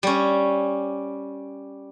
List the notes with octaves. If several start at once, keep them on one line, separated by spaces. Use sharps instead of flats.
G3 C#4